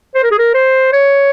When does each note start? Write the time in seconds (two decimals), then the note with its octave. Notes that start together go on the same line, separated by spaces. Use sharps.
0.15 C5
0.23 A#4
0.31 G#4
0.38 A#4
0.54 C5
0.92 C#5